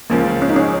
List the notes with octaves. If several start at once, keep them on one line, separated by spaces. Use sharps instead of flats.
C#2 C#3 F3 A#3
C#4
D#4
C#4